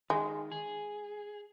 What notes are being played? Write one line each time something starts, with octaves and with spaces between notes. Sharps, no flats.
D#3 G#3
G#4